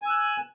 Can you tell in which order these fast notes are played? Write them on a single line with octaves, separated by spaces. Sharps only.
G#5 E6 F#6